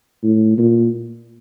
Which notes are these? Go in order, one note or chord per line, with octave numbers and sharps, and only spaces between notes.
A2
A#2